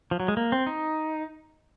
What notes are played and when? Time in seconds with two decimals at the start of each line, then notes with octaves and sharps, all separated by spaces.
0.11 F3
0.20 F#3
0.28 G#3
0.37 A#3
0.52 C4
0.67 D#4